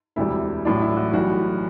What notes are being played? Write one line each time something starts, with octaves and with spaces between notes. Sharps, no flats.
E1 D2 C3 E3 G3 E4
A1 A2 F#3 D4
E4
F#4
B1 A2 E3 G3 F#4